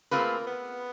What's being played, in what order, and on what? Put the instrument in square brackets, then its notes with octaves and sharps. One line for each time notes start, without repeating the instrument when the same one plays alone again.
[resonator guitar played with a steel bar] A3 C4 F4 G#4 B4 [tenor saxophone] A#3
[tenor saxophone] B3